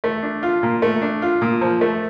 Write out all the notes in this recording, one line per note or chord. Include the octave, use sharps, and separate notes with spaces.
A3
D4
F4
A#2
A3
D4
F4
A#2
F3
A3